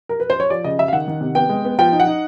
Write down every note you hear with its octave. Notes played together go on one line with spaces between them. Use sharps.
A#4
B4
C5
C#5
F3 D5
C#3 D#5
C#3 E5
F5
D#3 F#5
D#3
C3
B3 G5
G#3
B3
F3 G5
D#4
F#5
D#4